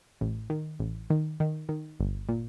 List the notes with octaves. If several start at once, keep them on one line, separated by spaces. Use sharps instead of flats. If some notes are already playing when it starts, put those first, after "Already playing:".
A1
D#3
A1
D#3
D#3
D#3
G1
A#2